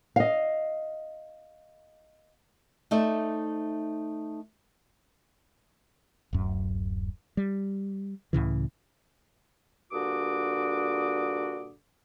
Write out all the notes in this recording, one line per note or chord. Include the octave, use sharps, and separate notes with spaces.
D#5 F5
A3 D#4 C5 D5 E5
D1 F#2
G3
C#2 A2 C#3 E3
G2 A#2 D3 F#4 D6 D#6